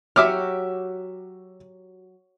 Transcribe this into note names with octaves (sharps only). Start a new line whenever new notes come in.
F#3 F#4 G4 E5 D6 F6